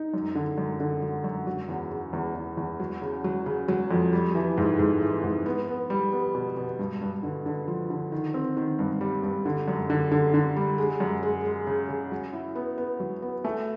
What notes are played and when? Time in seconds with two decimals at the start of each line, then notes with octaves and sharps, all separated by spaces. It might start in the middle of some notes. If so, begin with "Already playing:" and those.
Already playing: D#4
0.14 F#2
0.35 D3
0.58 F#2
0.80 D3
1.02 F#3
1.24 F#2
1.47 F#3
1.68 E2
1.91 C#3
2.13 E2
2.35 E2
2.57 E2
2.80 F#3
3.02 C#3
3.24 F#3
3.46 C#3
3.68 F#3
3.91 F2
4.13 G3
4.35 E3
4.58 G#2
4.79 G#2
5.02 E3
5.24 G#2
5.46 B3
5.68 B3
5.90 G3
6.12 B3
6.35 B2
6.57 B2
6.79 G2
7.01 G2
7.23 D3
7.46 D3
7.68 F3
7.90 D3
8.12 D#3
8.34 C4
8.57 D#3
8.79 G2
9.01 G3
9.23 G2
9.46 D3
9.68 F#2
9.90 D3
10.12 D3
10.34 D3
10.56 G3
10.78 G#3
11.00 F#2
11.23 G#3
11.45 G#3
11.67 C#3
11.89 C#3
12.11 F#3
12.33 E4
12.55 B3
12.78 B3
13.00 F#3
13.22 B3
13.45 A3